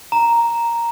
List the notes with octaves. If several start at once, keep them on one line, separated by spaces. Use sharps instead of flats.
A#5